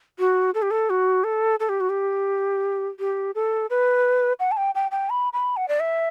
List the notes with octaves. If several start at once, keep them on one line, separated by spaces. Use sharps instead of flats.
F#4
A4
G4
A4
F#4
A4
A4
G4
F#4
G4
G4
A4
B4
F#5
A5
G5
G5
G5
B5
B5
F#5
D5
E5